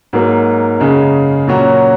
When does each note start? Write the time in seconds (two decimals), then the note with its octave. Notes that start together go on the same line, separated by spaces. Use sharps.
0.13 G#2 F#3 A#3
0.80 F#2 C#3 G#3
1.47 A#2 F#3 C#4 F#4